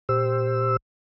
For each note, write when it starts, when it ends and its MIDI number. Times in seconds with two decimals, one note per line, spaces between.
0.09 0.76 46
0.09 0.76 67
0.09 0.76 72
0.09 0.76 88